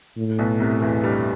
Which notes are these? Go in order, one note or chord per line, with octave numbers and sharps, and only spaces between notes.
A2
B1 B2
C2 C3
E2 E3
G2 G3